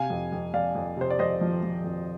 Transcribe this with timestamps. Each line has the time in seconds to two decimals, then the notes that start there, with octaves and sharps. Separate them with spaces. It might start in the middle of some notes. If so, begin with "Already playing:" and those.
Already playing: C3 F5 G#5
0.10 F2
0.32 F2
0.54 F2 D5 F5
0.75 F2
0.97 C3 C5
1.10 D5
1.19 F2 C5 D#5
1.41 F3
1.63 F3
1.84 F2